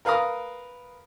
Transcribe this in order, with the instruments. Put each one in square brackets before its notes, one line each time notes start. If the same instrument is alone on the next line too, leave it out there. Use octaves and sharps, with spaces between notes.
[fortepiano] A#4 B4 F5 A#5 D#6 F6